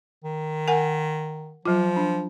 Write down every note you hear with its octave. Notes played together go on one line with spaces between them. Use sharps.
D#3
A#4 F#5 G#5
F3 F#3 F4
D4